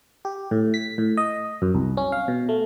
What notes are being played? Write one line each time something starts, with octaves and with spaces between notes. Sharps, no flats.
G4
A2
B6
A2
D#5
F#2
C2
C#4
F5
B2
A3